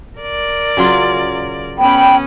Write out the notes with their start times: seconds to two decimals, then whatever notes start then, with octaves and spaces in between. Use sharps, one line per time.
0.19 A#4 D5
0.77 C#3 F#3 F4
1.78 B3 C#4 G5 B5